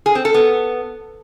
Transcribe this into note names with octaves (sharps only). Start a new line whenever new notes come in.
G#4
C4
A4
B3